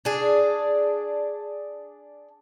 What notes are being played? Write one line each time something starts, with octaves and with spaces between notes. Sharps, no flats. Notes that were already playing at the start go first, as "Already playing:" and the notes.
D4 G#4